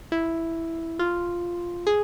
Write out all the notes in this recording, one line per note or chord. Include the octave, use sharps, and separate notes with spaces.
E4
F4
G#4